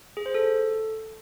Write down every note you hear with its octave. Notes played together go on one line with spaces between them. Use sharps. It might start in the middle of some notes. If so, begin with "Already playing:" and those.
G#4
C5
A4